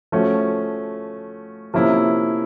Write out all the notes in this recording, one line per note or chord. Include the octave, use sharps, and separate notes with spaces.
F3 A3 C#4 F#4
C3 F3 A#3 C#4 E4